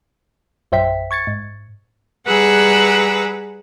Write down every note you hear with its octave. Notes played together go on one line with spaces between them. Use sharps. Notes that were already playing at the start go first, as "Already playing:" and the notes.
A#1 F#2 C5 E5 G5 B6
C#6 G#6 A6 C#7
G#2
G3 G#4 B4 F#5 A#5 E6